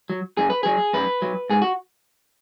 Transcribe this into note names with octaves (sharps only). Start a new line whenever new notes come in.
F#3
F#2 G#4
B4
F#3 G#4
F#2 B4
F#3
G#2 G#4
F#4